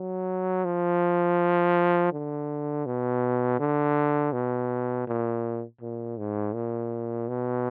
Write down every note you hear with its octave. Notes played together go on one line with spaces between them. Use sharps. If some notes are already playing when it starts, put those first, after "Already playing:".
Already playing: F#3
F3
D3
B2
D3
B2
A#2
A#2
G#2
A#2
B2